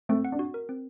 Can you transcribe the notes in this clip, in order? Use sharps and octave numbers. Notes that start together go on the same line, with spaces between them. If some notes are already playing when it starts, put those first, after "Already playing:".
A3 C4 A4
F#5
D4
F#4
A#4
C4